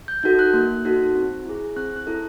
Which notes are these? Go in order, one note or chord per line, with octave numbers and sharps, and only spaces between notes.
G6
D#4 F#4 A4 G6
F#6
A#3
D#4 F#4 A4
C4
E4 G#4
C4 F#6
F#6
E4 A4